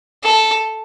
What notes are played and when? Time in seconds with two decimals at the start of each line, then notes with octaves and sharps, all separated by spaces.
0.23 A4